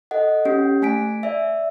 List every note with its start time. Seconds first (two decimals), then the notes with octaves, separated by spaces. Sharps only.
0.11 A4 D#5 F#5
0.45 C#4 G4
0.82 A3 G#5 B6 D7
1.23 D5 E5